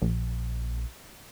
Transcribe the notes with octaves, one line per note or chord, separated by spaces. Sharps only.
A#1